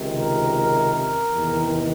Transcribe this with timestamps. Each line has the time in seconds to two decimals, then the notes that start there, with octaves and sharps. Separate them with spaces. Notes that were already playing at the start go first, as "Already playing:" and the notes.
Already playing: C#2 C3 D#3
0.15 A#4
0.54 A#4
0.93 A#4
1.32 E2 C3 D#3